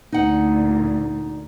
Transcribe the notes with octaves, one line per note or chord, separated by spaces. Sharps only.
D2 A#2 D#4 F#5